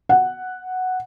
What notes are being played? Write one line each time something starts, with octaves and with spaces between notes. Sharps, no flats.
F#5